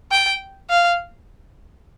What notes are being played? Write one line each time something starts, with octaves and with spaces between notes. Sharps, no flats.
G5
F5